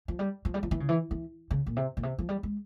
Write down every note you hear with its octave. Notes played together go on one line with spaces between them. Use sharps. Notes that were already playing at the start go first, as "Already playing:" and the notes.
F3
G3
F3
G3
F3
E3
C#3
E3
E3
C#3
A#2
C3
A#2
C3
F3
G3
G#3